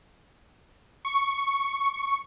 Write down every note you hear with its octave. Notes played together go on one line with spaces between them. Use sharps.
C#6